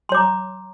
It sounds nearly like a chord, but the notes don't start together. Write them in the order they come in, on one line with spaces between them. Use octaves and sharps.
C6 C#5 D6 A#5